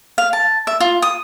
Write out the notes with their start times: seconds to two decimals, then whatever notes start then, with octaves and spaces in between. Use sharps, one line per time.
0.18 F5
0.33 A5
0.67 E5
0.80 F4
1.02 D#6